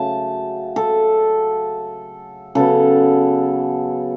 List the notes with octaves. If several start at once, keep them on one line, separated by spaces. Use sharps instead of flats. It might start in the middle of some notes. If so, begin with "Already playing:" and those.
Already playing: C#3 F#3 A3 A5
A4
C#3 F#3 B3 A4